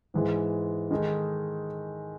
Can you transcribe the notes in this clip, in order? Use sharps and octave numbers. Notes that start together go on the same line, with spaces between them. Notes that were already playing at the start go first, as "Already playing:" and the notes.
G#2 E3 G#3
D#3 G#3 D#4 A4